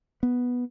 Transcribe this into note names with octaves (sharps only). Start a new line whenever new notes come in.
B3